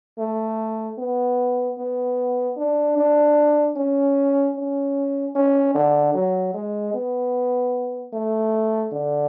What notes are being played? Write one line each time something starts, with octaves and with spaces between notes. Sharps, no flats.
A3
B3
B3
D4
D4
C#4
C#4
C#4
D3
F#3
G#3
B3
A3
D3